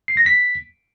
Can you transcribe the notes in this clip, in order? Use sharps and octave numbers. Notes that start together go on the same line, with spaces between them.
C7
A#6
B6